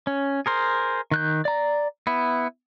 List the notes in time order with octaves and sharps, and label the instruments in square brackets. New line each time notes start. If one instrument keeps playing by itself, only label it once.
[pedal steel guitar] C#4
G#4 A#4 C5
D#3 F#6 G6
D5 A#5
B3 E4